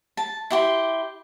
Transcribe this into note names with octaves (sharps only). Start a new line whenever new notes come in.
A5
E4 G4 C6